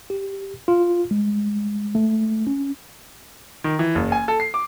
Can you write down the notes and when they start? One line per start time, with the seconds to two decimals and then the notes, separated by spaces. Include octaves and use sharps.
0.10 G4
0.68 F4
1.11 G#3
1.95 A3
2.47 C#4
3.64 D#3
3.79 E3
3.95 F#1
4.12 G#5
4.28 A4
4.40 C7
4.54 D6